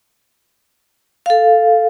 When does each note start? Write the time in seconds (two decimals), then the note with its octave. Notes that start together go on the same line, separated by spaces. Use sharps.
1.26 A4 F5